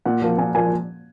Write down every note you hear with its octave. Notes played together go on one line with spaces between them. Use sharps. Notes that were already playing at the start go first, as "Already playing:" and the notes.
A#2 F#5
F3 A#3
A#2 G#5
F3 A#3 G#5